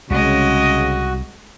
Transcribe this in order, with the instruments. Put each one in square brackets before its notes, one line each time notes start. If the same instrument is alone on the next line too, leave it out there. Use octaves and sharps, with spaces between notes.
[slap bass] C2 [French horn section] C#3 [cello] G#3 D#5 [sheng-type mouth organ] F#4